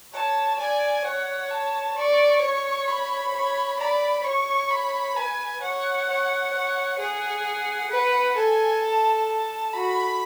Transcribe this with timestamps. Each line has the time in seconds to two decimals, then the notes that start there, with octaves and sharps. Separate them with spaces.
0.13 C#5 A5
0.59 D5 G#5
1.05 C#5 F#5
1.51 A5
1.96 D5 C#6
2.42 C#5
2.88 B5
3.34 C#5
3.79 D5 B5
4.25 C#5 C#6
4.71 B5
5.16 B4 G#5
5.62 C#5 F#5
6.08 C#5
6.53 C#5
6.99 G#4 F#5
7.91 B4
8.36 A4 G#5
8.82 A5
9.28 A5
9.73 F#4 B5